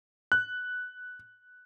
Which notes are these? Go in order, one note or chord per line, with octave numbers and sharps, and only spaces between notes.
F#6